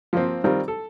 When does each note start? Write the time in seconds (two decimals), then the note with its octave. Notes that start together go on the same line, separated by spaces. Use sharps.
0.13 F3 A#3 C4
0.44 D#3 G3 C4 F4 A#4
0.68 A4